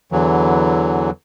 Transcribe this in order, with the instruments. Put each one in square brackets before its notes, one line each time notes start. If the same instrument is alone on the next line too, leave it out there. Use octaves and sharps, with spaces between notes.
[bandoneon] E2 D3 E3 F#3